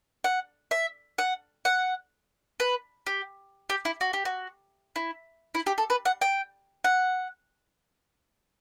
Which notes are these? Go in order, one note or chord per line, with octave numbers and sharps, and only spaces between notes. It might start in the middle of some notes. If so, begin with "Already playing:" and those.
F#5
E5
F#5
F#5
B4
G4
G4
E4
F#4
G4
F#4
E4
E4
G4
A4
B4
F#5
G5
F#5